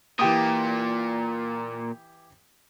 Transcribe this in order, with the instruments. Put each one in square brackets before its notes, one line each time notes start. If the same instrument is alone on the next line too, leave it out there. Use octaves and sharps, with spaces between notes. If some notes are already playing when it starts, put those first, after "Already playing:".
[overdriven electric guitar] A#2 [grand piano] E3 G4 D#6